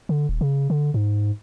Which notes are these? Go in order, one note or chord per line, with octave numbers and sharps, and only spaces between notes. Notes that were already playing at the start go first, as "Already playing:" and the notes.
D3
D#1
C#3
D3
G#2